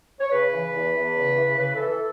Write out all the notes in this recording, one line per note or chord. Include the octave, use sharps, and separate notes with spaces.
C#5
C#3 B4
E3
E2
E2
C#3
E3
C#3 B4
E3 A4
A4